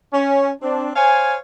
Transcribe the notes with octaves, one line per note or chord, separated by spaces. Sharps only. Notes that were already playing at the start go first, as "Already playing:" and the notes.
C#4
C4 D4
C5 C#5 F5 G#5